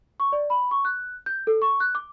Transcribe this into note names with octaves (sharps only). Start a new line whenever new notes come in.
C#6
D5
B5
C#6
F#6
G6
A4
C#6
F#6
D6